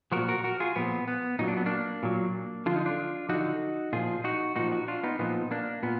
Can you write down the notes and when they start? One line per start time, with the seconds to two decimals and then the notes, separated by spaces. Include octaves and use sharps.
0.12 A#2 F3 F#4 A#4
0.28 F#4 A#4
0.44 F#4 A#4
0.60 F4 G#4
0.76 A#2 F3 B3
1.08 B3
1.39 A#2 F#3 D#4
1.48 D4
1.57 B3
1.66 A#3 D4
2.03 A#2 F#3
2.66 D3 F3 F4
2.76 D#4
2.86 D4 F4
3.29 D3 F3 D#4 F#4
3.93 A#2 F3 F4 G#4
4.24 D#4 F#4
4.56 A#2 F3 D#4 F#4
4.72 D#4 F#4
4.88 D4 F4
5.04 B3 D#4
5.19 A#2 F3 B3 D#4
5.51 A#3 D4
5.83 A#2 B3